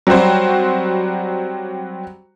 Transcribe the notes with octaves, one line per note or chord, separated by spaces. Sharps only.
F#3 G3 C4 F#4 C5